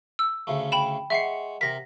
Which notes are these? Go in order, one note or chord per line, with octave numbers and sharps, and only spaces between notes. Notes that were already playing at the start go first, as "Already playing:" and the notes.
E6
D2 C#3 A3
G5 B5 E7
G#3 E5 F#5 C#6 C7
C3 A#4 A#6 B6